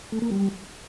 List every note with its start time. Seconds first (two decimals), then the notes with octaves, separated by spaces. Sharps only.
0.12 A3
0.22 A#3
0.31 G3